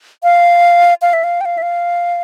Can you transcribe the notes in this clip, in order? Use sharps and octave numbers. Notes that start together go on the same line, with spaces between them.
F5
F5
E5
F5
G5
F5
E5
F5